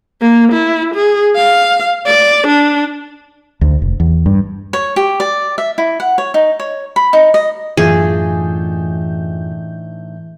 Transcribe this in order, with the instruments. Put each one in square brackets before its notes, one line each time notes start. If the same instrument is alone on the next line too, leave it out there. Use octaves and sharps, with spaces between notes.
[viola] A#3
E4
G#4
F5
D5
D4
[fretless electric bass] D2
F1
E2
G2
[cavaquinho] C#5
G4
D5
E5
E4
F#5
C#5
D#4
C#5
B5
D#4
D#5
[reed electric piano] F#2 F4 [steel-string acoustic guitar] A2 D4 D#4 [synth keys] E3 G6 [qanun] G#4